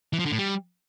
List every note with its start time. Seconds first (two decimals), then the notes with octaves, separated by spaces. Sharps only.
0.13 E3
0.19 F3
0.26 D3
0.32 A2
0.38 G3